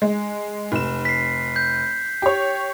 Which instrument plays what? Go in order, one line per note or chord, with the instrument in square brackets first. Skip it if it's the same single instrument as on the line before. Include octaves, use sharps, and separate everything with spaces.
[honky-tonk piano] G#3
F1 E7
[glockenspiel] B6 C7
G6
[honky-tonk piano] G4 C#5